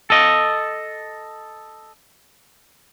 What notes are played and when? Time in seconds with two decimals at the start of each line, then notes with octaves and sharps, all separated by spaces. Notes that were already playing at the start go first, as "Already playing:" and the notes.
0.10 A4 D#5